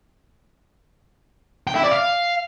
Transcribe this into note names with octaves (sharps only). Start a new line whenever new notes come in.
G5
E4
D5
F5